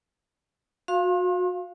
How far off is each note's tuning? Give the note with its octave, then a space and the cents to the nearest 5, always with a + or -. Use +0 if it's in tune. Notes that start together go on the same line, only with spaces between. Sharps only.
F#4 -30 F5 -5 C6 +40